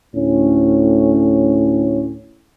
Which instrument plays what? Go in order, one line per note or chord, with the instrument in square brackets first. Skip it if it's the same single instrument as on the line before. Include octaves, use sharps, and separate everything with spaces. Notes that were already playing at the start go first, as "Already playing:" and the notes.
[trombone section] D2 A2 C#4